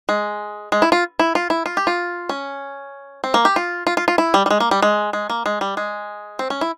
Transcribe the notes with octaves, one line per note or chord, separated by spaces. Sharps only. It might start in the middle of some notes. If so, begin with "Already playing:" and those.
G#3
G#3
E4
F4
E4
F4
E4
F4
G4
F4
C#4
C4
A#3
G4
F4
F4
F4
F4
E4
G3
G3
G#3
A#3
G3
G#3
G#3
A#3
G#3
G3
G#3
C4
C#4
E4